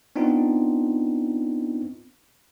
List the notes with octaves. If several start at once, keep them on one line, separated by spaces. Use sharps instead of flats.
B3 C4 D4 D#4 F4